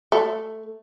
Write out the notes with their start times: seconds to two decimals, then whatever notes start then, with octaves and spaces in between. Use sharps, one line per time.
0.12 A3